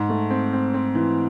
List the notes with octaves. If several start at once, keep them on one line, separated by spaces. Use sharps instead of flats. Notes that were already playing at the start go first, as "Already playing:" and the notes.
Already playing: G#2
A3
C4
C4
C4
E3